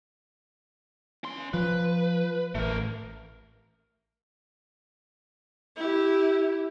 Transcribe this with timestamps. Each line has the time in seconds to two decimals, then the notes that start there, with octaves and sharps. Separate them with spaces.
1.24 C#4 C6
1.54 F3 B4
2.55 A1 A3 A#4
5.76 E4 G4